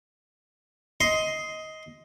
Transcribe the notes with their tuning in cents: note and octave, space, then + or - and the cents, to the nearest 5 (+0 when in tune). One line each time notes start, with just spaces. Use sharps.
D#5 +15 C6 +0